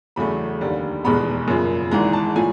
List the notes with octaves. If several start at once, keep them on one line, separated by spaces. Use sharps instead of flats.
E2 C#3 F#3 A3 B5
F1 D#2 D3 G3
F1 E2 B2 G#3 B3 B5
F#2 C#3 F3 A#3
G#1 G#2 E3 G#3 A#5
A5
A2 F3 G#5